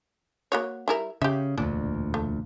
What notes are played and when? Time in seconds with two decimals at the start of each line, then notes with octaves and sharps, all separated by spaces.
0.52 A#3 F#4 C#5
0.88 G3 E4 A#4
1.22 C#3 G4 E5
1.58 E1 D2 A#2 D4
2.14 A3